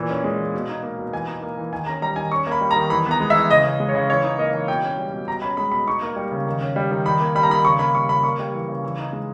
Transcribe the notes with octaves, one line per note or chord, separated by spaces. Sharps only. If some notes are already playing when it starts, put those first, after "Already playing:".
Already playing: A#2 E3
C#4
G#3
E3
B2
D#4
A#3
B2
E3 G#5
D#4
A#3
E3
D#3 G#5
C#4 A#5
G3 A#5
D#3 G#5
C#4 C#6
A#3 B5
G3
A#5
D#3
E3 B5
B3 A#5
G#3
E5
E3
C#3 D#5
C#4
G#3
C#5
C#3
E3 C#5
D#4
A#3 D#5
E3
B2 G5
C#4
G3
B2
B2 A#5
C#4 B5
G#3 B5
B2 B5
D#4 C#6
A#3
G3
C#3
D#3
C#4
G3
D#3
D#3 B5
A#3
G3 B5
A#5
D#3 B5
C#3 C#6
A#3 B5
G3 C#6
C#3 B5
A#3 C#6
G3
E3
C#3
E3
D#4
G#3